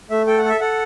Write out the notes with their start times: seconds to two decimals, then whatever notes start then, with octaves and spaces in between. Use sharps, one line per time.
0.10 A3 E5
0.27 A4 G5
0.38 F#5
0.45 A4 E5
0.60 A4 F#5